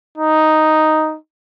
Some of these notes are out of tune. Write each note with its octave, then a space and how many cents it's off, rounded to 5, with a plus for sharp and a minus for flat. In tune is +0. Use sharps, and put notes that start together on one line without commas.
D#4 +0